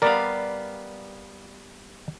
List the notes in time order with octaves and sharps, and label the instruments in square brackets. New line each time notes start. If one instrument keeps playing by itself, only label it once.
[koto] G3 B3 F5 [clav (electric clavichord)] A#4 D5